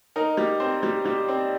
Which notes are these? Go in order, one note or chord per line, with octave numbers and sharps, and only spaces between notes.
D#4 A#4
G3
C4 C5
G3
G3
C4